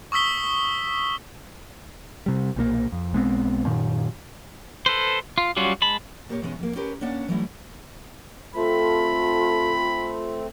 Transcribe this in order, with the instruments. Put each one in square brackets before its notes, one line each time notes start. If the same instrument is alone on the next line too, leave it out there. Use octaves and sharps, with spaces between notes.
[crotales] C#6 D#6 E6 B6 G7
[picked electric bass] C3 G3
B1 A#2 D3 A#3
F2
B1 G#3 B3 C4
F#2 A#2 D#3
[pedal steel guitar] A4 B4 C5
F4
F#3 G3 C#4 F4 F#4
G#3 A5 B5
[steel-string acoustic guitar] A#2 A#3 G4 C5 C#5
E2 B2 G#3 B3 C#4
F2 A#3
C#4 G4 A#4 B4 C#5
A#3 C#4 D4 C#5 F#5 A5
E3 F#3 G3 A3 E4
[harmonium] A3 C4 [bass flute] F4 [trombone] A4 [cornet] B5